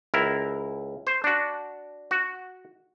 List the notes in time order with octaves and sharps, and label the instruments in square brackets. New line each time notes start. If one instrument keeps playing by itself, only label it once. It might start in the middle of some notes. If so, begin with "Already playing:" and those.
[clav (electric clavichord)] C#2 E4 A#4
C5
D4 F#4
F#4